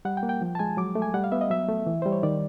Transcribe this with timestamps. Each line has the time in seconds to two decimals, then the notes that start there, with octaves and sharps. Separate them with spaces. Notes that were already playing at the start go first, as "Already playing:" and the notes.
0.05 G3 F#5
0.17 G5
0.23 A#3
0.29 G5
0.41 F3
0.55 A5
0.59 G#3 G#5
0.77 F#3 D6
0.95 A3
1.02 G#5
1.14 G3 F#5
1.24 F5
1.32 B3 E5
1.41 D#5
1.50 F#3 E5
1.69 A3
1.86 E3
2.02 G3 C5
2.12 C#5
2.23 D#3 D5